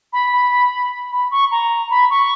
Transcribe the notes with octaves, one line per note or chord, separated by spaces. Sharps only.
B5
B5
B5
C#6
A#5
B5
C#6